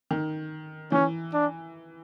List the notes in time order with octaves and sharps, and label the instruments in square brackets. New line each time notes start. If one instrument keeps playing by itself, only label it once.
[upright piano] D#3
[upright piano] E3 [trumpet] C#4
[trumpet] D4